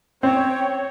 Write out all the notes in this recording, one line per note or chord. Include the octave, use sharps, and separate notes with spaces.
C4 C#5 G5